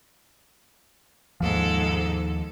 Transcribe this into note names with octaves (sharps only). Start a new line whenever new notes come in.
D#2 G#2 F3 A4